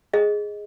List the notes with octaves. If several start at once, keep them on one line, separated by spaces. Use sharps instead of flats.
G#4 D#5